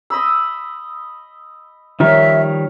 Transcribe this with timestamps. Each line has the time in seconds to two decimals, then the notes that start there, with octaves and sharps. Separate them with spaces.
0.10 D#5 B5 E6
2.00 D#3 F3 G3 A#4 C#5 E5